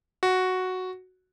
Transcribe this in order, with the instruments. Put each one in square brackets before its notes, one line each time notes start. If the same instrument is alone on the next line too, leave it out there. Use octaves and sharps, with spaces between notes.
[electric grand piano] F#4